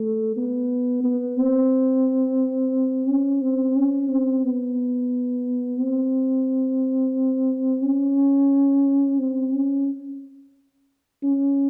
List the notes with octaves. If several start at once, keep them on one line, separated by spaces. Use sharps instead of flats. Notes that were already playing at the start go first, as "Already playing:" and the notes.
Already playing: A3
B3
B3
C4
C#4
C4
C#4
C4
B3
C4
C#4
C4
C#4
C#4